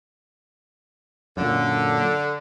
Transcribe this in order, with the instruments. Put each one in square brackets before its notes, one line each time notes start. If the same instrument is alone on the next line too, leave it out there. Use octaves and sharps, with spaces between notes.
[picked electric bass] F#2 A#2 [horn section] D3